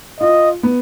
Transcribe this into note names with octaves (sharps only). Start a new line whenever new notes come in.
F4 D#5
B3